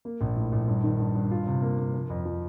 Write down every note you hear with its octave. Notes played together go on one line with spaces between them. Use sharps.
A#3
A#1
A2
A#1
G2
D#3
G2
G2
F4
C3
A#3
A#3
F3
F2
F3